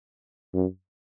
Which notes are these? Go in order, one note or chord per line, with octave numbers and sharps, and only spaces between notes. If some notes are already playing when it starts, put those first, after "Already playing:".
F#2